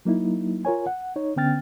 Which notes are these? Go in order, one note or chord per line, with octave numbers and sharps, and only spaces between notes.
F#3 A#3 D#4 E4
F4 A#4 C#5 G#5
F#5
D#4 C#5
D3 B3 C#4 G5 F6 A6